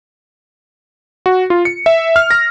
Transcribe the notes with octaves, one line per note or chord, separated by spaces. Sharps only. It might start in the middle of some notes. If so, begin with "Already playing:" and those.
F#4
F4
C#7
E5
F6
A#6